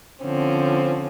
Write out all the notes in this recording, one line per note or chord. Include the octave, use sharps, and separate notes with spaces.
D3 F3 C4 C#4